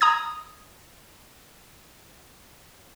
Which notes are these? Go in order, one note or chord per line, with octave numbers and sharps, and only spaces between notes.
A#5 D#6 G#6